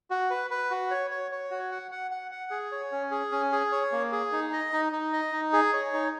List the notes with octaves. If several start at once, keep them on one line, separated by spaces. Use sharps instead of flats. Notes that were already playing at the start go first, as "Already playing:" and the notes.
F#4
B4
B4
F#4
C#5
C#5
C#5
F#4
F#5
F#5
F#5
F#5
G#4
C#5
C#4
G#4
C#4
G#4
C#5
A#3
G#4
D#4
D#5
D#4
D#4
D#5
D#4
G#4
C#5
D#4